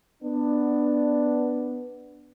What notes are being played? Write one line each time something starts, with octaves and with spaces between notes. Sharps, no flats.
B3 D4